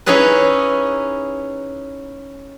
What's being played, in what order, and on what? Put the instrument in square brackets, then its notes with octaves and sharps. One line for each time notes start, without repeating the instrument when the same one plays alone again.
[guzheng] C#4 D#4 E4 G#4 B4